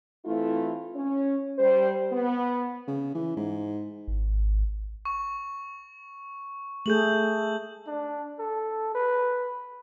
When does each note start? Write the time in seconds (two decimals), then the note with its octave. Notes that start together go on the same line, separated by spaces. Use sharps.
0.26 E3 A3 C4 E4 F4
0.95 C#4
1.59 G3 C5
2.12 B3
2.87 C#3
3.14 E3
3.36 G#2
4.08 G#1
5.05 C#6
6.86 A3 G#4 A4 G6 F#7
7.87 D4
8.39 A4
8.95 B4